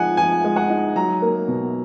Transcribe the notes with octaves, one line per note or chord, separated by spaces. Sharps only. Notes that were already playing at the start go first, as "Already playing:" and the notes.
Already playing: F3 G#3 D#4 F#5 G#5
F3 G#5
G#3
F#5
D#4
F#3 A#5
A#3
B2